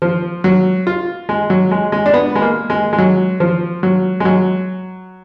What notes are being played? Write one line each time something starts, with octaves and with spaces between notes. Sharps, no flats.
F3
F#3
F4
G#3
F#3
G#3
G#3
D4
B3
G#3
A#3
G#3
G#3
F#3
F3
F#3
G#3
F#3